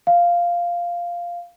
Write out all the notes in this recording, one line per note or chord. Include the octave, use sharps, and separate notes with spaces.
F5